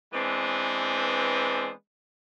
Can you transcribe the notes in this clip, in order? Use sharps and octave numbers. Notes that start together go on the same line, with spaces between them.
E3 G#3 B3 C4 D4